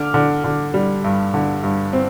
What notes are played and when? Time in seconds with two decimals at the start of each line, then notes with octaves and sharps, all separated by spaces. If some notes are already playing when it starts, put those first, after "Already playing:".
Already playing: D3 D6 F6
0.14 D3
0.44 D3
0.74 G3
1.04 G2
1.34 D3
1.63 G2
1.93 C4